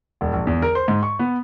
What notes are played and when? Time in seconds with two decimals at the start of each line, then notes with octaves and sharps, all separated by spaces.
0.21 E1
0.33 A#1
0.47 E2
0.62 A#4
0.75 C5
0.88 G#2
1.03 C#6
1.19 B3